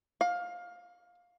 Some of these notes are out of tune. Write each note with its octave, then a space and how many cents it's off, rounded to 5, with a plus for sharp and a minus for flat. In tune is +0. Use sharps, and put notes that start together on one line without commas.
F5 +20